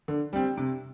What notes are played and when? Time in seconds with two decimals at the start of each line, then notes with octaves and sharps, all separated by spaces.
0.08 D3
0.33 G3 C4
0.57 C3